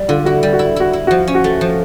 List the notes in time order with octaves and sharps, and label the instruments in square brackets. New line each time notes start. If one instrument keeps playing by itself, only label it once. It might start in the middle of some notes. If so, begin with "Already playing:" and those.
Already playing: [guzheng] G3
[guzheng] D3 [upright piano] F4
[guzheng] E4 [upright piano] F#4
[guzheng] G3
[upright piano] F#4
[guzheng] E4
[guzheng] E4 [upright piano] F#4
[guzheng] E4
[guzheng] F3 [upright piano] F#4
[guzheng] C#4
[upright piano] F#4
[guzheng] A3
F3